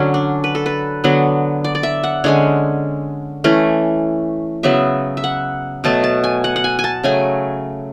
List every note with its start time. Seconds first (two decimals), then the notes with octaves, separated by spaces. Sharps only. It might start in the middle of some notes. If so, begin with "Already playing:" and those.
Already playing: D3 F#3 C#4
0.14 D4
0.44 B4
0.55 A4
0.66 B4
1.04 D3 F#3 B3
1.64 D5
1.75 D5
1.83 E5
2.04 F#5
2.24 D3 G#3 C#4 C#5
3.44 E3 A3 C#4
4.63 C#3 F#3 B3 E5
5.17 E5
5.24 F#5
5.84 B2 F#3 A3 A5
6.04 A5
6.24 G#5
6.44 F#5
6.56 F#5
6.64 G#5
6.79 G#5
6.84 A5
7.03 C#3 F#3 A3 G#5